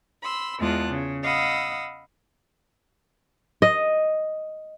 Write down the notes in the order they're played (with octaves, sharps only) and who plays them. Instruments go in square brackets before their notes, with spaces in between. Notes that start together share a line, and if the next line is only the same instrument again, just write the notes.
[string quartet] B5 C6 E6
E2 G#3 F4 A5 F#6
C#3
D#5 F5 F#5 B5 D#6 E6
[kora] D#5